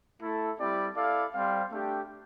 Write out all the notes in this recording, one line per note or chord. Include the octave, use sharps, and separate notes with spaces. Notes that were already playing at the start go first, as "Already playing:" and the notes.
A3 E4 A4
G3 C4 E4 G4 D5
E4 A4 D5 F5
G3 C4 G4 C5 F5
A3 D4 G4